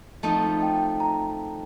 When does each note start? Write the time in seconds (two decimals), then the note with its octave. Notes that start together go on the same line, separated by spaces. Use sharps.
0.23 F3 A3 C4 D#4 A5
0.63 G5
1.00 A#5